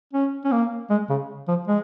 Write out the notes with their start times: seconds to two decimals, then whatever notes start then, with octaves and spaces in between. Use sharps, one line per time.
0.13 C#4
0.44 C#4
0.52 A#3
0.90 G#3
1.09 C#3
1.48 F3
1.67 G#3